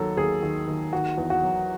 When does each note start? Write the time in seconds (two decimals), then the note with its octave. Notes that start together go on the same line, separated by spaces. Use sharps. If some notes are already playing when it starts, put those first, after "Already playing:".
Already playing: D#2 D#3 F#3 A4
0.17 D#2 G#4
0.43 D#3
0.67 D#2
0.93 D#3 F#4
1.18 E2
1.30 F#4
1.43 F#3